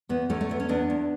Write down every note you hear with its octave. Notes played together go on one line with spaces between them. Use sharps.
E2 B3
E2 A3 C#4
A3
E2 B3
C#4
E2 B3 D4
E2